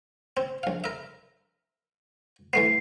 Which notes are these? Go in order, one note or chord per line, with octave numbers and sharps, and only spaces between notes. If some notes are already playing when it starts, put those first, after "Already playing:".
C4
A#1 F5
A#4 E5
E3 A3 B3 C7